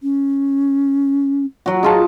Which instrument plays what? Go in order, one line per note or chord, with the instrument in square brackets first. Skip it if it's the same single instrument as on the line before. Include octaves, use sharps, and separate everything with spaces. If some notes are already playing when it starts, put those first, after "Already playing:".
[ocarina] C#4
[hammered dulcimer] F#3 F#4
[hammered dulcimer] D#4 F4 A5 [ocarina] G#4